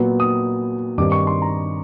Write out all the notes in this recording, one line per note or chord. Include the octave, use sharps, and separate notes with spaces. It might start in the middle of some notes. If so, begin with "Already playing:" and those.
Already playing: A#2 F#3 B3
D#6
G2 D#3 G3 C4 D6
C#6
C6
A#5